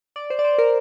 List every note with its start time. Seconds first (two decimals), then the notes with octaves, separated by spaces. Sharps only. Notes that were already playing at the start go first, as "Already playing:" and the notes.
0.16 D5
0.30 C5
0.39 D5
0.45 C5
0.58 A#4